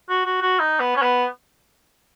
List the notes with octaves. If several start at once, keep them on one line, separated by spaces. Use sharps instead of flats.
F#4
F#4
F#4
D#4
B3
C#4
B3